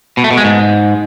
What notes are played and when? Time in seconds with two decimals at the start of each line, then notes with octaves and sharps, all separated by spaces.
0.17 B2
0.24 A3
0.31 B2
0.37 G#3
0.44 G#2